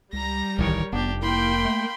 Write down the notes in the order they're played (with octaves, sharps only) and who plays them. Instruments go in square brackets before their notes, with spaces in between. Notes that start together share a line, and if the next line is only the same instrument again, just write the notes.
[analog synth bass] C#2 [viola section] G3 [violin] A#5 A#6
[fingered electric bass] D1 D#3 E3 [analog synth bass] C2 [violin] A#4 C#5
[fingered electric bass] F1 [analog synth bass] B3 [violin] D4 G4
[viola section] A#3 G5 [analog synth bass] E4 [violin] B5 C6
[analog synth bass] A3